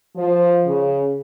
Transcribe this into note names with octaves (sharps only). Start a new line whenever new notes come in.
F3
C#3